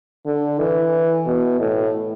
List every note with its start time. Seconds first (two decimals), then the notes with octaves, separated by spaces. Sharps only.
0.26 D3
0.59 E3
1.26 B2
1.60 A2